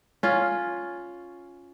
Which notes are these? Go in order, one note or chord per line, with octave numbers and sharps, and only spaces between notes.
C#4 F4